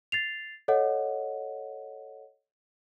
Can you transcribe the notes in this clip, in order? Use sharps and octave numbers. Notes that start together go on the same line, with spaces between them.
A6 C7 F7
A4 C#5 D#5 F#5